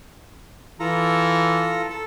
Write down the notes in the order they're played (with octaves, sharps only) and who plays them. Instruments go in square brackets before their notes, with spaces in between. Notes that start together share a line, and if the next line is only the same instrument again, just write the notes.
[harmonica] E3 [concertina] F4 A4 A#5
[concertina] A4